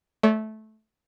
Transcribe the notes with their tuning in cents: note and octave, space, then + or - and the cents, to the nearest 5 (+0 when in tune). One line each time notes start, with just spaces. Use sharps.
A3 -15 C#5 +45